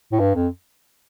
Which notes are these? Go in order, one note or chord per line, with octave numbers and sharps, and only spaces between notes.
A2
G2
F2